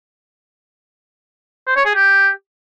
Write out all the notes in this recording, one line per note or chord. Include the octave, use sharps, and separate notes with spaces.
C5
C#5
G#4
G4